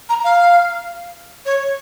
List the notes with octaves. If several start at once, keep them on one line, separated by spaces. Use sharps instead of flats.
A#5
F5
C#5